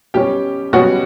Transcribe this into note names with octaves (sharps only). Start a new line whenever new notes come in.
B2 G3 C#4 G4 G5
B2 G3 C#4 F#4 F#5